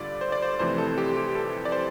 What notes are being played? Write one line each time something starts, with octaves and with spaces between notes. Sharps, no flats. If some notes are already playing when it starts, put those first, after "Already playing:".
Already playing: G2 D3 G3 F4 D5
C5
D5
C5
F2 C3 E3 A3 C5
A4
G4
G4
A4
D5
C5